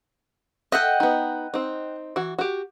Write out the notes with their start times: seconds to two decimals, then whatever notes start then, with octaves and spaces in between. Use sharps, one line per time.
0.72 A4 D#5 E5 F#5 G5
1.00 B3 D#4
1.54 C4 D#4
2.16 E3 F#4
2.39 F#4 G4